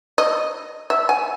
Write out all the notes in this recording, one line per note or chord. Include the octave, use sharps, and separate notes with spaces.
D#5
E5
G#5